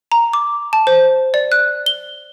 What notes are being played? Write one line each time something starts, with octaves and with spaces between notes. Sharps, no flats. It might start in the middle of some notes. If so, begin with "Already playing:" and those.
A#5
D6
A5
C5
D5
F#6
G7